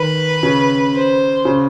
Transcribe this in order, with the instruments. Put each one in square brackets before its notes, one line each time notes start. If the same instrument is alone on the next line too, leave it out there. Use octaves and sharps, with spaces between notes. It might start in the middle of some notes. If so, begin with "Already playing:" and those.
Already playing: [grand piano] D#3 [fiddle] B4
[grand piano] C#3
[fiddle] C5
[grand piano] C#3